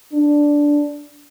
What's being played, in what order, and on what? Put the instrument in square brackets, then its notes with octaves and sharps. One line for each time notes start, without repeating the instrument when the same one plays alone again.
[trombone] D4